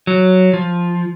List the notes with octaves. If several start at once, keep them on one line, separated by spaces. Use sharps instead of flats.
F#3
F3